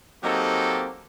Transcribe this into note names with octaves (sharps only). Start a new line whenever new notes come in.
F#3 A#3 C4 D#4 G4 A4